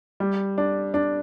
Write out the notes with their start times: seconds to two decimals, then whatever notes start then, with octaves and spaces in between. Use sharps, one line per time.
0.20 G3
0.58 D4
0.94 D4